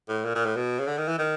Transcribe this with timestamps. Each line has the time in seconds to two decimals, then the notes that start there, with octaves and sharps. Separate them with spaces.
0.09 A2
0.25 A#2
0.35 A#2
0.45 A2
0.56 B2
0.79 C#3
0.87 D3
0.98 D#3
1.08 E3
1.19 D#3